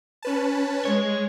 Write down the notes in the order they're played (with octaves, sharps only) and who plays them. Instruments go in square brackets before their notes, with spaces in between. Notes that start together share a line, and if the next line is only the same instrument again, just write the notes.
[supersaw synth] C#4 B4 A5
[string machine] G#3 [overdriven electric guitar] C#5